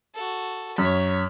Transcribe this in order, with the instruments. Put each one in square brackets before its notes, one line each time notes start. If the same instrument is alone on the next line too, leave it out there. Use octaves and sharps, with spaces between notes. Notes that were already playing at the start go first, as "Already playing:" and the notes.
[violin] F#4 A4
[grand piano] F#2 [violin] C#5 B6